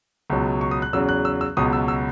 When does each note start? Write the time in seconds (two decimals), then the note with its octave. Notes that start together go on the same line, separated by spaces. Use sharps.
0.30 C#2 B2 F#3
0.61 C#6
0.71 D#6
0.82 F#6
0.93 E2 C#3 F#3 E6
1.09 F#6
1.25 E6
1.41 E6
1.57 C#2 B2 F#3 D#6
1.73 E6
1.88 E6